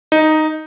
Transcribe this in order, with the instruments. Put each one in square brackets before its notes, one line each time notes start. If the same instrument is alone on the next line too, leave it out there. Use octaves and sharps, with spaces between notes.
[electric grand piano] D#4